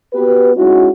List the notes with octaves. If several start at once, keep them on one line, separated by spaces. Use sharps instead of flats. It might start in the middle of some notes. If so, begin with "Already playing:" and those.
B3 F#4 G4 B4
G#3 C#4 D#4 E4 F#4